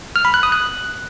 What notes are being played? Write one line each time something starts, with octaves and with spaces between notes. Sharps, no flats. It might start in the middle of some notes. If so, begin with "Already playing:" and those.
F6
B5
F#6
D#6
F#6